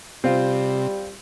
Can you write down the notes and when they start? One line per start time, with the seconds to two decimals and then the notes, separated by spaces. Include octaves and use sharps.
0.24 C3 G3 C4 F4